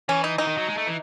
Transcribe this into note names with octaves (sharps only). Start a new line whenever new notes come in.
E3 C#4
D#4
E3 D#4
D#3
F#3
G#3
A3
E3